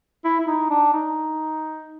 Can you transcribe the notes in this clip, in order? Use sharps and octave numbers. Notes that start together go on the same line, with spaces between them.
E4
E4
D#4
D4
D#4